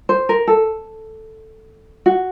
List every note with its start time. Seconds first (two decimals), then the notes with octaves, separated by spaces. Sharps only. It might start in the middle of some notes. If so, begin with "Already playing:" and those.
0.09 C5
0.29 A#4
0.47 A4
2.06 F#4